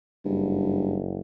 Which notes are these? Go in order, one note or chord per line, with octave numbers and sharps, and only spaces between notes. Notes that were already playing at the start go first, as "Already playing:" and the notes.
F#1 G2